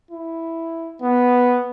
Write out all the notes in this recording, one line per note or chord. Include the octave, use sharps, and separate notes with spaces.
E4
B3